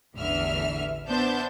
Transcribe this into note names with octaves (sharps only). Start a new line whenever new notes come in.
A1 E2 D3 E3 E5 F6
B3 D4 C5 E5 A5 G6